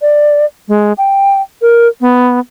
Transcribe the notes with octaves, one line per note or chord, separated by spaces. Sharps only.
D5
G#3
G5
A#4
B3